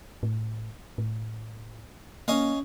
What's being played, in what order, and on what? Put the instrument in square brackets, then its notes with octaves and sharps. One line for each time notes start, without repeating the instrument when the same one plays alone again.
[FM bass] A2
A2
[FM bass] A#3 [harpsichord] C#4 D#5 F5